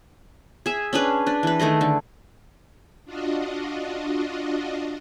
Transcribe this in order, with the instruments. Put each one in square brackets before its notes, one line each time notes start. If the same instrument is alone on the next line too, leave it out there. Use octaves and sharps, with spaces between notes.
[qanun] G#4 E5
C#4 D4 G#4 B4
D4 B4
E3 B4
D#3 A3 G#4 D#5
D3
[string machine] D4 F4 F#4 D#5